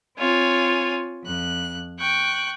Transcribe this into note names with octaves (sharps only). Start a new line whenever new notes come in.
C4 F4 C#5 G#5
F2 F#6
G5 C#6 F#6